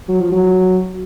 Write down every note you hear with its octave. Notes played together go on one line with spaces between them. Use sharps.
F#3
F3
F#3